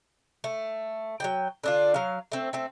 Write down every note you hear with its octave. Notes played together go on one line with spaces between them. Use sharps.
A3
F#3 G3 G5
D3 D4 F4
F#3 F5
A3 C4
A3 C4